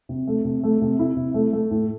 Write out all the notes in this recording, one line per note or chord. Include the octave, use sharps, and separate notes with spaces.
C3
A3
C3
A3
C3
E4
C3
A3
A3
A2